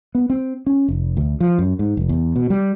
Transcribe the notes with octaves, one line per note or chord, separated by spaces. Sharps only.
B3
C4
C#4
F1
D2
F3
F#2
G#2
F1
E2
B2
G3